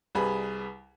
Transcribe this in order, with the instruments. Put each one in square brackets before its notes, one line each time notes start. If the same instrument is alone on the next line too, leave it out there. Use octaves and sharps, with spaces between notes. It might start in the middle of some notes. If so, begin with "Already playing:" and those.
[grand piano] C2 G3 G#4 B4 B5